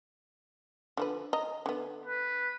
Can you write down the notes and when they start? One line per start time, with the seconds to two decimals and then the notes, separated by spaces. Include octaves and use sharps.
0.97 D3 F3 B4
1.33 D#5 A#5
1.66 D3 B3
2.06 B4